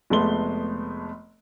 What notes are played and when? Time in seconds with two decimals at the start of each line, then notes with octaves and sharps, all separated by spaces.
0.10 F1 G#3 A3 B3 C6 G7